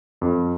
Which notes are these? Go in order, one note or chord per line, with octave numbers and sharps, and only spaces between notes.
F2